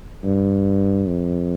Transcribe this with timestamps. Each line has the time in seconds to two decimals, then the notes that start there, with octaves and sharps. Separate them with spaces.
0.24 G2
1.07 F2